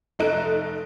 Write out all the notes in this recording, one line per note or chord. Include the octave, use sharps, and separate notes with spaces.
F1 A3 D#4 F#6 D7